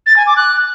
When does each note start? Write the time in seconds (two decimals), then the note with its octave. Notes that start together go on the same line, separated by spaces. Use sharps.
0.06 A6
0.17 G#5
0.27 D6
0.37 F#6